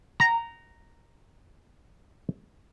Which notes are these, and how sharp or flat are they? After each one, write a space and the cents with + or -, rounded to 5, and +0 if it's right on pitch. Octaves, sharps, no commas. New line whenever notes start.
F#5 +45 A#5 -5